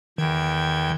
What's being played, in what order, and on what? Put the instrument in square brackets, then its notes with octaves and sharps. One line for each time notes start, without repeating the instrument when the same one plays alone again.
[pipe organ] E2 G5 G#6 [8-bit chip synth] D#3